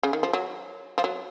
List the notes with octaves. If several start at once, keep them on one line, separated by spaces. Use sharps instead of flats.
C#3
D#3
F3
F#3
F3
F#3